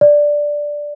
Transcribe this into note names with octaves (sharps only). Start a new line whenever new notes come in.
D5